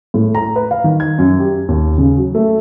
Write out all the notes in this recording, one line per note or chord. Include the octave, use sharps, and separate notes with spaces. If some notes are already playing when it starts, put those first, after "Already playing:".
A2
A#5
B4
F5
D#3
G#6
F#2
G4
D#2
C#3
F#3
A3